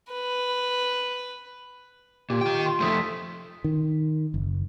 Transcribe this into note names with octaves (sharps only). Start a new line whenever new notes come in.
B4
A#2 G4
D#3 F4 G5
C6
F2 A3 C6 D#6 B6
D#3
F#1